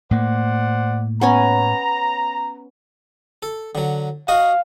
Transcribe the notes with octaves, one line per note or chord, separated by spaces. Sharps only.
A2 A#3 C5 D5 F#5
B3 C#4 G#5 A#5
A4
D3 F#3
F#4 D#5 F5 C#6